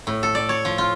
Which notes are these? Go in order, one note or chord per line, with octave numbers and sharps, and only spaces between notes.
A2
A4
D5
C#5
F3
F4